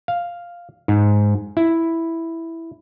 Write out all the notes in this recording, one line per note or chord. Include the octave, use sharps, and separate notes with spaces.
F5
G#2
E4